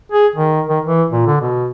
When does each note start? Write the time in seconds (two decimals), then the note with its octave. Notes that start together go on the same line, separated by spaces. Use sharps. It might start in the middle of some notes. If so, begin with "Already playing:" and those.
0.12 G#4
0.36 D#3
0.69 D#3
0.85 E3
1.12 A#2
1.26 D3
1.41 B2